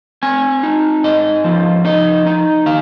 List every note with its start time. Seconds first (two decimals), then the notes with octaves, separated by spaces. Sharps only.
0.23 C4 G#5
0.63 D#4
1.04 G#2 D#5
1.44 F3
1.85 D#4 D#5
2.26 D#4
2.66 D#3 F5